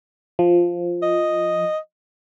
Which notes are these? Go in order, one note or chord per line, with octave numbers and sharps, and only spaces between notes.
F3
D#5